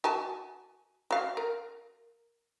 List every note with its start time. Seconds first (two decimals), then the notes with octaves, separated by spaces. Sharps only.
0.04 F#4 G#5 A5
1.11 F#4 F5
1.37 A#4